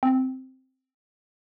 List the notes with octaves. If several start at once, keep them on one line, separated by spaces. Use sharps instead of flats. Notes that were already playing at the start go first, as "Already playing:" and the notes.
C4